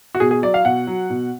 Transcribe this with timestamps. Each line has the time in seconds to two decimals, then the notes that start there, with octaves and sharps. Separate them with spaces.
0.15 F#4
0.20 B2 G#4
0.31 G#4
0.42 F#3 D5
0.54 F5
0.65 B2 F#5
0.87 F#3
1.10 B2